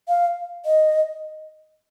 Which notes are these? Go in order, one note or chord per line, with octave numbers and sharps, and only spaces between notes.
F5
D#5